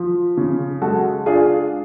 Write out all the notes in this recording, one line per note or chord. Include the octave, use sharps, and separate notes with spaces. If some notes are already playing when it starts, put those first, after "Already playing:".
Already playing: F3
C#3
G#3 F#4 A4
D4 F4 G#4